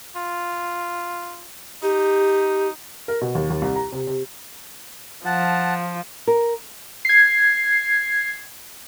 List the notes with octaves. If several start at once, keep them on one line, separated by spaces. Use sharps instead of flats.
F4
D#4 G4
A#4
B2
D#2
D#2
C2
A#5
C3
C3
F3 F#5 A5
A#4
G#6 C7